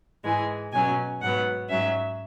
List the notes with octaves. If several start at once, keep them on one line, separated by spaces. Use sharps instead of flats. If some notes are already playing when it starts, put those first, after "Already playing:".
G#2 E3 G#3 G#5
B2 F#3 C#4 G#5
G#2 F#3 B3 F#5
G#2 F#3 C#4 E5